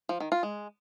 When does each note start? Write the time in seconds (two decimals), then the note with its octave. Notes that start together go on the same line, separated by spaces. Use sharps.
0.09 F3
0.20 D#3
0.32 F4
0.43 G#3